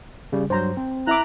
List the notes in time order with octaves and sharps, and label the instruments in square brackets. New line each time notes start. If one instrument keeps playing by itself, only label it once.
[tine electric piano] C#3 G3
[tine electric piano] G2 F#3 [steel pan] C5 A#5
[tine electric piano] C4
[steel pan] E4 E5 D6 [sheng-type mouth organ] A#5 F#6